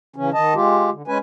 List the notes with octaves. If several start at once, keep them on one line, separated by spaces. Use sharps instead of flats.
C#3 E3 C#4
D#3 D#5 A5
G#3 F4 G4
D3
G#3 C#4 B4 G#5